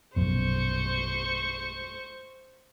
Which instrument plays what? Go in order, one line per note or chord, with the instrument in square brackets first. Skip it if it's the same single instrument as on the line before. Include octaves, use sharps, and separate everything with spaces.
[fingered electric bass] A#1 F#2 B2 [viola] C5 C#6